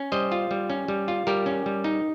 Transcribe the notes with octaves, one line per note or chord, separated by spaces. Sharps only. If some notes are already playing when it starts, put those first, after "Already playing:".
Already playing: C#4
G3 C5 D#5
F4
G3
C#4
G3
F4
G3 G4 A#4
C#4
G3
D#4